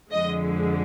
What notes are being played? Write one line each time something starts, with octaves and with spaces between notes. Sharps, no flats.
F2 D3 F3 G#3 D#5